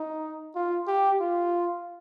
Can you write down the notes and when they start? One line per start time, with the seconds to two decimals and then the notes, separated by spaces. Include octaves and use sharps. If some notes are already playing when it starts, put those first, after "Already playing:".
Already playing: D#4
0.55 F4
0.88 G4
1.20 F4